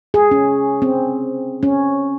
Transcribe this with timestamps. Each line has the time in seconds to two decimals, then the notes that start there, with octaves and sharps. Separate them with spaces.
0.14 G#4
0.31 C#4
0.82 C4
1.63 C#4